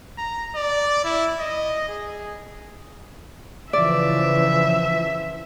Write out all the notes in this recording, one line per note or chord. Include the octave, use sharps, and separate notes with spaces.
A#5
D5
E4
D#5
G#4
C#3 E3 F3 D5 E5